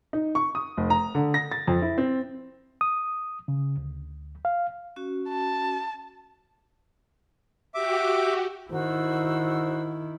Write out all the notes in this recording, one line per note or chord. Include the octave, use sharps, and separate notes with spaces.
D#4
C#6
D#6
F1
A#5
D3
A#6
A6
F2
E4
C4
D#6
C#3
D2
F5
C#4 F#4
A5
F#4 G4 E5 D6
D#3 E4 F#4 C5 E6